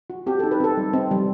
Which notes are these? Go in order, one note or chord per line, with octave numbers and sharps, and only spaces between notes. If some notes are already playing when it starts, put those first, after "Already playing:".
F#4
C4 G4
D#4 A4
B4
C4 A4
G3
C4
G3